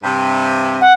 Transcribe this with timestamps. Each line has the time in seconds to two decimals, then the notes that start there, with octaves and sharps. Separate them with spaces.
0.04 G2 C3
0.81 F#5